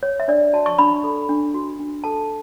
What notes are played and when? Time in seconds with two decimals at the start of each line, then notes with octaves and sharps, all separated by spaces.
0.03 C#5
0.20 E5
0.28 D4 D5
0.53 F#4 A5
0.66 C#6
0.78 D4 B5
1.04 A4
1.29 D4
1.54 F#4
1.79 D4
2.04 A4 A5